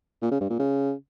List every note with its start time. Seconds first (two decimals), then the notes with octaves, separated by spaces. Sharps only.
0.22 A#2
0.31 C#3
0.40 G2
0.50 A#2
0.59 C#3